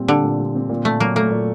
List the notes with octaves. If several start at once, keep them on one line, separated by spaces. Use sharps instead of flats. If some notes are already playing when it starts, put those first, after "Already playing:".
Already playing: A#2 G3 C4
D3 G4
A#2
G3
C4
A#2
A#2 A3
F#3 A#3
A3 A#3
A#2